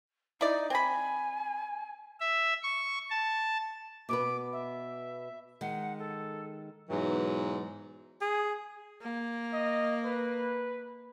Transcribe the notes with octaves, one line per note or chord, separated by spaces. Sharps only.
D#4 E4 D5
C4 G#5 B5
E5
C#6
A5
B2 B3 B4 D6
E5
D#3 G#3 F#5
A4
G#2 B2 E3 F#3
G#4
A#3
D#5
B4